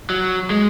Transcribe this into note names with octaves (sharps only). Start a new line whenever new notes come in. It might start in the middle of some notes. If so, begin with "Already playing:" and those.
F#3
G#3